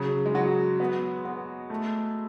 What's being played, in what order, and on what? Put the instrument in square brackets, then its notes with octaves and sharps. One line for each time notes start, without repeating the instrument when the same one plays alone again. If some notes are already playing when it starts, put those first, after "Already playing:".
Already playing: [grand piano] C#3 [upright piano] F#3
[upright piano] G#3
[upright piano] F#3 [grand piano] F#4
[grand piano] B3
B3
A3